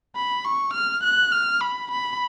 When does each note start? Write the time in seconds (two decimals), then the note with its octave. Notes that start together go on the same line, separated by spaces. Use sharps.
0.16 B5
0.45 C#6
0.73 F6
1.04 F#6
1.32 F6
1.61 B5
1.91 B5